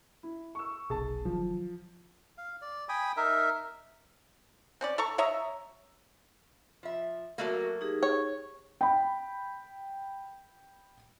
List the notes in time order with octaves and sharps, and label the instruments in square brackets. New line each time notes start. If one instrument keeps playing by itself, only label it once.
[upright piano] E4
C#6 E6
[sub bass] F1 [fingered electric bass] B1 B2 [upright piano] G#4 A5
[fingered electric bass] D#3 F#3 [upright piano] F3
[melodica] F5
D5
G5 G#5 B5 D#6
D#4 A#4 E5
[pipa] C4 C#4 D5
A4 A#5 C#6
C#5 D#5 E5 A#5
[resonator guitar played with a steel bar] F3 E5
[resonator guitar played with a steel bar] F#3 A3 A#3 [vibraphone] F#4 A4 A#4
[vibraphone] D#4 G4 G#4
[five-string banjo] C#5
[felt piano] G5 B5